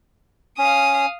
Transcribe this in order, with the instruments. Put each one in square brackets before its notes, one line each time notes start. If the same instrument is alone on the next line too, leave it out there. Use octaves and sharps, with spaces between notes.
[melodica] C#4 [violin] F5 D#6